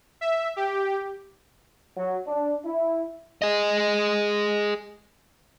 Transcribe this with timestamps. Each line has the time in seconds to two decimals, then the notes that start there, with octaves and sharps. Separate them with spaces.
0.21 E5
0.56 G4
1.97 F#3
2.27 D4
2.64 E4
3.42 G#4 D#5